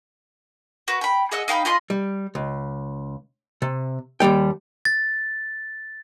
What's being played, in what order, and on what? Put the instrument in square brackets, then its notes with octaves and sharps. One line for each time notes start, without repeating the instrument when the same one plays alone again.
[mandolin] F#4 B4
G5 B5
G#4 D#5 F#5 E6
D#4 F5 G5 B5
F4 D#5 B5 C6
[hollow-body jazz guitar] G3
C#2
C3
D#2 B2 G3 G5
[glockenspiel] A6